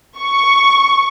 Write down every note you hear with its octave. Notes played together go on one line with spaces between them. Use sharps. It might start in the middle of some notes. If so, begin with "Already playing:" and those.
C#6